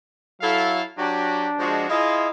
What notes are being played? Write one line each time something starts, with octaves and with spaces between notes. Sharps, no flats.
F#3 E4 A4 F5
F#3 D4 F#4 G4
F3 G#3 F#4
E4 F4 G#4 D#5